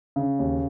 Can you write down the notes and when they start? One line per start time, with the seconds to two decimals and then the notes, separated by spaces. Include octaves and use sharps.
0.16 C#3
0.39 D#2